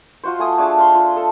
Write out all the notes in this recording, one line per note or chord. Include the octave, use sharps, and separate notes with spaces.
F4 F#4 C5
A3 G#5 D#6
A3 D4 G#4 A5
F5 C6
F4
A4